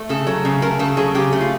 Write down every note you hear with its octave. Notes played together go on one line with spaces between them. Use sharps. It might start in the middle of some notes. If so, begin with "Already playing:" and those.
Already playing: A3
C#3 A4
F#3
C#3
A3 A#4
C#3 A4
F#3 G#4
C#3 G4
A3
F4